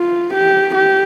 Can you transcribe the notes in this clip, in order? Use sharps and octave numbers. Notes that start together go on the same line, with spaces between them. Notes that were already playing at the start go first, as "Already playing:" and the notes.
Already playing: F4
G4
G4